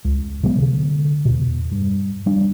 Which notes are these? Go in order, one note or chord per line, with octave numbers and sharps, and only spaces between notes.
C#2
C3 F#3 G#3 B3
D3
E2 B2
G2
G3 D4